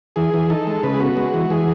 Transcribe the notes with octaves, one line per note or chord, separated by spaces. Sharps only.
E3 G#4
E3
D#4 A4
G#3
C#3 B4
G#4
B3 F#4
G#3
E3
E3 G#4